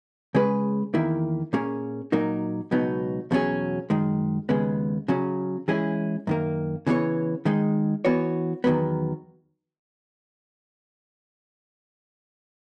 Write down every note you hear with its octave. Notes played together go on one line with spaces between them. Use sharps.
C#3 G#3 C#4 G#4 B4
E2 D#3 A#3 E4
A#2 A#3 C#4 G#4
A#2 F#3 A#3 D#4 A#4
C#2 B2 F#3 B3 D#4
E2 B2 F#3 C#4 G#4
F#2 D#3 G#3
D#2 C#3 G#3 B3
C#3 F#3 C#4
E3 G#3 C#4 E4 G#4
F#2 D#3 A#3
C#3 E3 B3 F#4 C#5
D#3 G#3 D#4
E3 B3 F#4 C#5
E2 D#3 F#3 B3